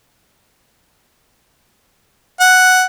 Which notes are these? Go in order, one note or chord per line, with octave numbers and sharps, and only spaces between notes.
F#5